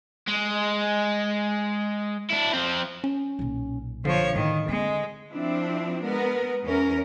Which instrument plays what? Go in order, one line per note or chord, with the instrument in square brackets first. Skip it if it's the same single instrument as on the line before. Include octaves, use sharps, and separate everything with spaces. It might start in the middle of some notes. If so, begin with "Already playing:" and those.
[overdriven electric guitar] G#3
D4 E4
F3 C4
[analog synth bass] C#4
[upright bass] B1 A#2
[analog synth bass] D3 [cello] F3 C#5
[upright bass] A2 [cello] D#3
[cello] G#3 [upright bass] C4 C#4
[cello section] F3 C4 D4 E4
G#3 B3 A#4
E2 C#4 A#4